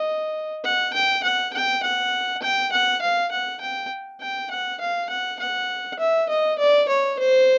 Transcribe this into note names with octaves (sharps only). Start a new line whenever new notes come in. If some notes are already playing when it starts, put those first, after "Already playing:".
Already playing: D#5
F#5
G5
F#5
G5
F#5
G5
F#5
F5
F#5
G5
G5
F#5
F5
F#5
F#5
E5
D#5
D5
C#5
C5